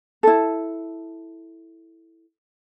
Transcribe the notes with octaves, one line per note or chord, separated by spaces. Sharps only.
E4 A4